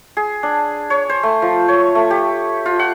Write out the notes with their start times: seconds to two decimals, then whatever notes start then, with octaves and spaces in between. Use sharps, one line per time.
0.17 G#4
0.43 D4
0.90 C#5
1.09 C5
1.23 A3
1.42 F3
1.68 C#5
1.95 A3
2.10 G4
2.66 F4
2.79 F#5